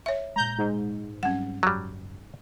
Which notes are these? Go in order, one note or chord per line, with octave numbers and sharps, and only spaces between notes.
C#5 E5
A#2 G#3 A#5 G6
G#2
F#3 G3 C4 C#4 F#5
F#1 F#3 G3